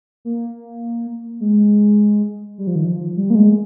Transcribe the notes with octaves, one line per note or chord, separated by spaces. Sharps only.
A#3
G#3
G3
F3
D#3
F3
G3
A#3
G#3